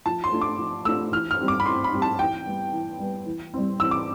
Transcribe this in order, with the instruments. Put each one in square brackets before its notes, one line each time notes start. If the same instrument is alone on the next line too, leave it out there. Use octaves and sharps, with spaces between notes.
[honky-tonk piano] F3 [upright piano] A5
[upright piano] C6
[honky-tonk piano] A3 D4 F4
[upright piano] D6
[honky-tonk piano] F3
[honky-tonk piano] A3 D4 F4 [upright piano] E6
[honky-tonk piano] E3 [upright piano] F6
[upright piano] F6
[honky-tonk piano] G3 C4 G4
[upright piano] D6
B5
[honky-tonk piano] E3 [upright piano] C6
[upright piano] B5
[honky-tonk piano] G3 C4 G4
[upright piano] A5
[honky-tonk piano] E3 [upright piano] G5
[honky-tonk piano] G3 B3
E3
G3 B3
E3
G3 C4
[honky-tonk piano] E3 [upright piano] E6
[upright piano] D6